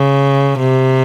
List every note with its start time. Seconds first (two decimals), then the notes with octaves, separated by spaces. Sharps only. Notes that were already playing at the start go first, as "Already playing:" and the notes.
Already playing: C#3
0.59 C3